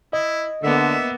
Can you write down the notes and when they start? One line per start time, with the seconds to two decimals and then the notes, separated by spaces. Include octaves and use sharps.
0.13 E4 D#5
0.63 D3 A#3 B3 E5